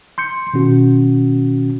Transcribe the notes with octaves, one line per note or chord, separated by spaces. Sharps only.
C6 G6 C#7
B2 D#3 C#4 F#4